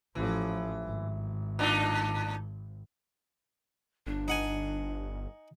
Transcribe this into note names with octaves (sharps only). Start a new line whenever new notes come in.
A1 E3 F3
G#1
A2 D4 D#4
G1 D4
D#4 F#5 G#5